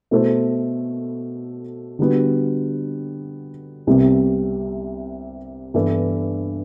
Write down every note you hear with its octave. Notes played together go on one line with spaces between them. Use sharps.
B2 A3 E4 A4 C5
D3 G3 B3 F#4
C2 C3 G3 B3
G2 E3 B3 D4 A4